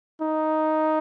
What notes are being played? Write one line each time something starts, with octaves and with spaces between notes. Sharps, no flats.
D#4